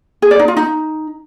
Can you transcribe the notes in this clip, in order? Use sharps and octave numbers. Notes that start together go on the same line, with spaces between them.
G#4
D5
D#4
F4
D#4